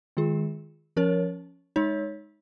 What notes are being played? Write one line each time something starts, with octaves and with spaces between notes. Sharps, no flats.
D#3 G#3 F4 G#4
F3 C#4 A#4 C#5
G#3 D#4 C#5